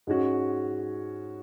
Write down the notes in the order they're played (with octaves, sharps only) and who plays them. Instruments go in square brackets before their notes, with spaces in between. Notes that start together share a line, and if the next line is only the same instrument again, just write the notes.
[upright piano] G#2 G#3 C#4 F#4